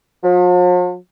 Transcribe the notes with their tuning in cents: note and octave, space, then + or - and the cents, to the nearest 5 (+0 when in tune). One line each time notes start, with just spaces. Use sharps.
F3 +45